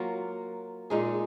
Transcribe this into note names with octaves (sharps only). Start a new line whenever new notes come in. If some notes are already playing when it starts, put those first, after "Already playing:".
Already playing: F#3 A#3 F4
A#2 G#3 D#4 G#4